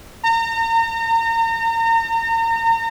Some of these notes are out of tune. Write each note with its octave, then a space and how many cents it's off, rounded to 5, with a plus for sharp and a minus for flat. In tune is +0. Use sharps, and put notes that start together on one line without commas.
A#5 -35